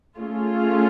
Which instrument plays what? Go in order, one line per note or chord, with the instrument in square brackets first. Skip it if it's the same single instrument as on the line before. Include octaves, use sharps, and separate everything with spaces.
[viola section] A3 C#4 F4 G#4